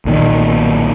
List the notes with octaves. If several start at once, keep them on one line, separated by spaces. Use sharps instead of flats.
B1 A#2 D#3